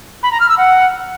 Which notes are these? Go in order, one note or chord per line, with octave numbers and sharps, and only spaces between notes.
B5
A#5
F6
E6
F#5